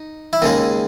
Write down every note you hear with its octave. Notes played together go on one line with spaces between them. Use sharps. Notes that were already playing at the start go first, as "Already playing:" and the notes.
Already playing: D#4
E4
D#2 C#3 G#3 D#4